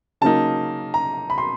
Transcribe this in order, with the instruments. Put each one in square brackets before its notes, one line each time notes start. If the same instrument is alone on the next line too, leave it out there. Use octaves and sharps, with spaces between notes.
[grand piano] C#3 F#3 A#3 D#4 A5
A#5
B5
C6